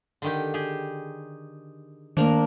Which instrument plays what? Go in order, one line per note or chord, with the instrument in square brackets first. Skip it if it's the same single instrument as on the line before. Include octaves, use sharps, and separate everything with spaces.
[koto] D3 D#3 G4
G4 G#4
[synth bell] D#3 [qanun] A#3 D4